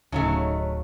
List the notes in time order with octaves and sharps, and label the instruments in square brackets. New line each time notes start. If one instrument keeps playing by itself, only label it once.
[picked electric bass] D1 [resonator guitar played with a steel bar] C#3 F#3 A3 [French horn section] D#4 C#5